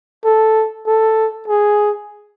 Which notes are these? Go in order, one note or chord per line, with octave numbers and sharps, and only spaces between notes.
A4
A4
G#4